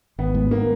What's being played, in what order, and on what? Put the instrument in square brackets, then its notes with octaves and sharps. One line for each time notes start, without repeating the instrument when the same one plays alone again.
[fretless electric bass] G#1 [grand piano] B3
[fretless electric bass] G#2
[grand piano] A#3